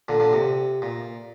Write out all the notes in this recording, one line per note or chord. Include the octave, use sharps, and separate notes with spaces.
A#2 D3
A#2 D3
C3
A#2